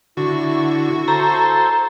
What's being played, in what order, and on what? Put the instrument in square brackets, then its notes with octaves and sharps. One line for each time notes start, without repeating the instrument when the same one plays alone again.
[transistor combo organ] D3 [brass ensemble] E4 [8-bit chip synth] F#4 C#6
[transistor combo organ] A4 C5 [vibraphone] A#5